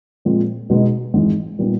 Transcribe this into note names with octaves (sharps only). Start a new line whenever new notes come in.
A#2 F3 G#3 C4
B2 G#3 B3 D#4
G#1 G#2 E3 G#3
A#2 G3 B3 D#4